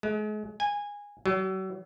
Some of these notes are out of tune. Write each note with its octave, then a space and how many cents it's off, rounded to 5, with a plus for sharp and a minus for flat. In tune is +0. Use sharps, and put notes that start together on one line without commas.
G#3 +40
G#5 -15
F#3 +40